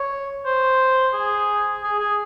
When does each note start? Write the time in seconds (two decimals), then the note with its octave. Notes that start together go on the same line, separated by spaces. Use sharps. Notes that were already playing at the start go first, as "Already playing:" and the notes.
Already playing: C#5
0.46 C5
1.14 G#4
1.83 G#4
2.00 G#4